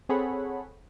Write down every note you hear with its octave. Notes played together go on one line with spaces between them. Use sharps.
C4 G#4 A4 C#5 F#5 B5